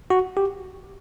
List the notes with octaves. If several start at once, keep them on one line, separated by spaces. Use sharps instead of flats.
F#4
G4